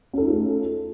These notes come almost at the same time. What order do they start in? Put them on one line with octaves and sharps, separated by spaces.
C#4 A4 D#4 F4 A3